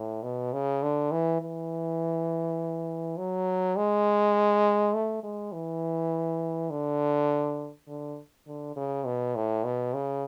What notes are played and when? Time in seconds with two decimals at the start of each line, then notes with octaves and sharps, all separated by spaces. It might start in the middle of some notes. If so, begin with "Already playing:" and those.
Already playing: A2
0.23 B2
0.53 C#3
0.82 D3
1.11 E3
1.41 E3
3.17 F#3
3.76 G#3
4.94 A3
5.23 G#3
5.52 E3
6.70 D3
7.88 D3
8.46 D3
8.76 C#3
9.05 B2
9.35 A2
9.64 B2
9.94 C#3